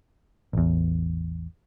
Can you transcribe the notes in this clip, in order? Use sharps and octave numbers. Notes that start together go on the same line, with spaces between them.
A1 E2